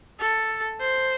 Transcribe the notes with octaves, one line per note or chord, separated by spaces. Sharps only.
A4
C5